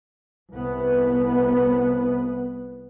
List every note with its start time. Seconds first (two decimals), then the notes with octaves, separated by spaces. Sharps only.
0.51 C2 B3